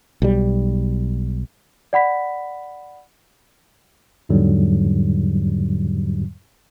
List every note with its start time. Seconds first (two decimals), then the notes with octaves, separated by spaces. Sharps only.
0.22 B1 G3
1.93 D5 F#5 B5 B6
4.29 E2 G#2 D3 F#3 G3